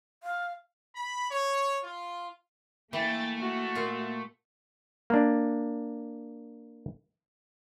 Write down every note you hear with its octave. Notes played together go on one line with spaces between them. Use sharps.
F5
B5
C#5
F4
E3 A3 A#3 G5 A6
F#4
A#2 F4
A#3 D4